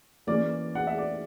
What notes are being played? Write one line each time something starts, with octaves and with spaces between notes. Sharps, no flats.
E3 A#3 C#4 D5
F#5
E5
D5